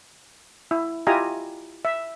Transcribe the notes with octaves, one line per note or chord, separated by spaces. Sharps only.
E4
E4 F4 G4 D#5 G#5 A#5
E5